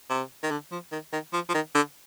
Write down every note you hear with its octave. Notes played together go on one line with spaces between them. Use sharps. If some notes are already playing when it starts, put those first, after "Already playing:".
C3
D#3
D3
F3
D#3
D#3
F3
F3
D#3
D3